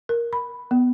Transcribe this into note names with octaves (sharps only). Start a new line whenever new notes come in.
A#4
B5
B3